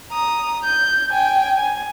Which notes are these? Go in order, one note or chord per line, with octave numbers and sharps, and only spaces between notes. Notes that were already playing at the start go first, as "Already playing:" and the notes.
A#5 D#6
G6
G5 G#5
G#5